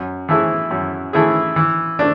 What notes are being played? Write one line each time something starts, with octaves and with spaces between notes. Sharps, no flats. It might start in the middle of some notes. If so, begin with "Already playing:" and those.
Already playing: F#2
E3 A3 E4 G#4
F#2
E3 A3 E4 G#4
E3
A3 D4